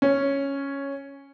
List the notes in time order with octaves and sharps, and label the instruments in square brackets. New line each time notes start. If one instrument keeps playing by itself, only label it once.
[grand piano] C#4